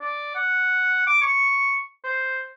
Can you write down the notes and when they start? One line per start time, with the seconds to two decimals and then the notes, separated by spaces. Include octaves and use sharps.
0.01 D5
0.35 F#5
1.07 D6
1.22 C#6
2.04 C5